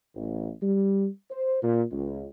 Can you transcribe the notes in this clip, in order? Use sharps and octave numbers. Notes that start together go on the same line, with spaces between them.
A1
G3
C5
A#2
C#2